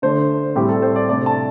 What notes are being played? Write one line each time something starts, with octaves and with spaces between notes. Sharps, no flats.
D3 A3 D4 C5
A2 G3 C4 G4
A4
C5
D5
C3 A3 D4 D5
A5